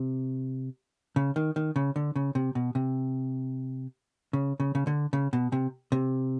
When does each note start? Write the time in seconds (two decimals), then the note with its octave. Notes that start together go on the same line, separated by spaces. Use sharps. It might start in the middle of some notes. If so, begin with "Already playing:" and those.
Already playing: C3
1.16 C#3
1.36 D#3
1.56 D#3
1.76 C#3
1.96 D3
2.16 C#3
2.35 C3
2.55 B2
2.75 C3
4.33 C#3
4.60 C#3
4.75 C#3
4.87 D3
5.13 C#3
5.33 B2
5.52 C3
5.92 C3